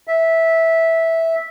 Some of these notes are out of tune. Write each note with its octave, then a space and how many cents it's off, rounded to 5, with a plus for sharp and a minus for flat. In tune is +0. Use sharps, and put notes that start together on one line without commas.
E5 -10